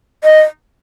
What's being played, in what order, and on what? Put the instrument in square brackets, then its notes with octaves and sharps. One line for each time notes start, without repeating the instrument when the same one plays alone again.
[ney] D#5